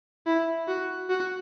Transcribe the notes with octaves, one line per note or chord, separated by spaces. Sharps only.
E4
F#4
F#4